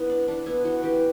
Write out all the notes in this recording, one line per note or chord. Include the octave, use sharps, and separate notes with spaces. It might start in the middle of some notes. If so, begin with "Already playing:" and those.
Already playing: B3 E4
D4
E3 D4
B3 E4
E3 F#4
E3 G4